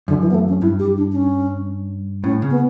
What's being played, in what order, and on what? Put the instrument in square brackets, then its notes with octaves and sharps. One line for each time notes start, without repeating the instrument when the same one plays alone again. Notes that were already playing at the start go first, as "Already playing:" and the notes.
[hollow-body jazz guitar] F#2 [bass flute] D3
[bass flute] E3
B3
A3
C#4
[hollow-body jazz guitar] G2 [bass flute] E4
[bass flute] G4
D4
D4
C#4
[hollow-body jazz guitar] A2 [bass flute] C#4
[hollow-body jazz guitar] C#3
[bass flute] B3